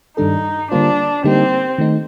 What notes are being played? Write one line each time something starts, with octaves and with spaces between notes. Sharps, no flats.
G2 D#3 G3 D4 D#4 A4
D3 G3 A#3 D4 F4 C5
D3 G3 A#3 C4 D#4 G4
D#3 A3 D#4